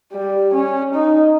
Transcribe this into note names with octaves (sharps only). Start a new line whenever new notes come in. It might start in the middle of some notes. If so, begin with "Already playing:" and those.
G3
C#4
D#4